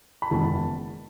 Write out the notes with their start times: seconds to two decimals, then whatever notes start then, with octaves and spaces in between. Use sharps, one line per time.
0.22 B5
0.31 F#1 E2 D#3 G#3 A5